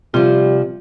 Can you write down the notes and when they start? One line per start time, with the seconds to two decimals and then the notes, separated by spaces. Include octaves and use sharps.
0.14 C3 F3 G3 F4